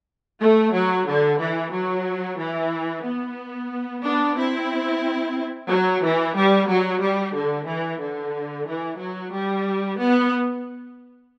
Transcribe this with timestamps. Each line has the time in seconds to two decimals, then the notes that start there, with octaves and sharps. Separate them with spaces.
0.41 A3
0.74 F#3
1.08 D3
1.40 E3
1.74 F#3
2.39 E3
3.05 B3
4.04 B3 D4
4.38 C4 E4
5.70 F#3
6.03 E3
6.36 G3
6.69 F#3
7.02 G3
7.35 D3
7.67 E3
8.00 D3
8.67 E3
8.99 F#3
9.33 G3
9.99 B3